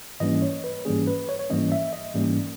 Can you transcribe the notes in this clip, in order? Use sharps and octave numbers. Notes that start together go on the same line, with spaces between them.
G#2 E3 G3 A#3 C#4 D#5
C#5
B4
G#2 E3 G3 A#3 C#4 G#4
B4
C#5
C#5
G#2 E3 G3 A#3 C#4 D#5
E5
D#5
G#2 E3 G3 A#3 C#4